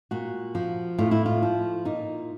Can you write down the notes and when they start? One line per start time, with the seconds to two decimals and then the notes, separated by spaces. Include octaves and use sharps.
0.11 A#2 F#4
0.55 F3
0.98 A2 F4
1.11 E4
1.26 F4
1.43 F3
1.85 A#2 D#4